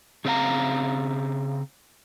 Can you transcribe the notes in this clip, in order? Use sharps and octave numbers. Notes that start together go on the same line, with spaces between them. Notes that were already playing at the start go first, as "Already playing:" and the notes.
C#3 C4 C5 F5 A#5